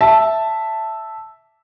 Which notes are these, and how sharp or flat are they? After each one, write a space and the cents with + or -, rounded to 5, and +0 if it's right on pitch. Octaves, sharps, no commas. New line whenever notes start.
E5 +0 A5 +0